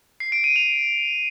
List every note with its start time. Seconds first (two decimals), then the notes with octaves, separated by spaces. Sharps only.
0.20 C7
0.32 D7
0.44 D#7
0.56 F7